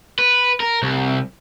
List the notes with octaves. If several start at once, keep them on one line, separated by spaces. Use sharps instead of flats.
B4
A#4
C2